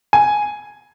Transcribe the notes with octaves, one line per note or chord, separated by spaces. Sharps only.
G#5